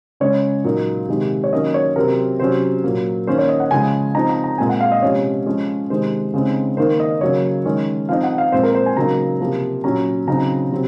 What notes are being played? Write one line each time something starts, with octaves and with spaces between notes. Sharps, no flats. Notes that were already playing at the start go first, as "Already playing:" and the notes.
C#3 G#3 C#4 C#5
A#2 F#3 A#3 D#4
C3 D#3 G#3
C#5
D#3 F#3 A#3 C#4 D#5
C#5
C3 F#3 C4 A#4
C3 F#3 C#4 C5
A#2 F#3 A#3
D#3 A#3 C#4 C5
C#5
D#5
F#5
C#3 F3 G#3 G#5
F3 C4 D#4 A#5
A#5
A#5
A#2 G#3 C4 G#5
F#5
F5
D#5
C3 F3 G#3 C#4 C#5
F3 G#3 C#4
C3 D#3 G#3 C5
C#3 G#3 C4 D#4
D#3 A#3 D#4 C5
D#5
C#3 F#3 A#3 C#5
D#3 G#3 C#4
F3 C4 D#4 F5
F#5
F5
A#2 F3 G#3 C4 C5
A#4
C5
G#5
C#3 F#3 A#3 D#4 A#5
C3 F3 A#3
A#2 F#3 C#4 A#5
C#3 F#3 C4 D#4 A#5
C3 F#3 C4